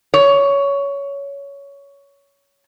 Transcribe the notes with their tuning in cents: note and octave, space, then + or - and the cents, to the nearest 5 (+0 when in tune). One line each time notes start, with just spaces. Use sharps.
C#5 +15